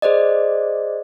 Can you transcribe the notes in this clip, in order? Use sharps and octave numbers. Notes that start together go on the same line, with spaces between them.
G#4 C5 D5 D#5